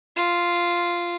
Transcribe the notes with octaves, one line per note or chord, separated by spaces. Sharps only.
F4